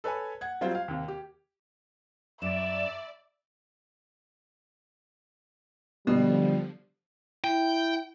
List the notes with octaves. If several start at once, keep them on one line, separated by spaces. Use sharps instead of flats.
A4 B4 C#5 G#5 B5
F#5 G#6
F#3 G3 C4 F4 C5
F5
D#2 C3
G4
F#2 D5 E5 E7
B2 D3 F3 G3
E4 G5